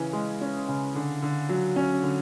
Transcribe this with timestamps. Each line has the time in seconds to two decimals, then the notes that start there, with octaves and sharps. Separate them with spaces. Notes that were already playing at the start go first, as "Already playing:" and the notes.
Already playing: C#3 E3 C#4
0.13 G#3
0.41 C#4
0.68 C#3
0.95 D3
1.22 D3
1.49 F#3
1.76 C#4
2.03 D3